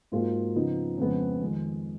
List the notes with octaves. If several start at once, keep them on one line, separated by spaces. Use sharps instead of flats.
G#2 F#3 A#3 F4 G#4
C#3 F3 B3 D#4
F2 C#3 G#3 B3
F2 D#3 G#3